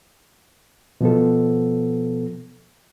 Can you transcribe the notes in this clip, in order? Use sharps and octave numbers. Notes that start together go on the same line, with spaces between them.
B2 F3 B3 A4